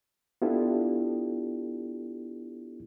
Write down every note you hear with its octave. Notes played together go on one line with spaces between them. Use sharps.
B3 D4 E4 F4 G4 A4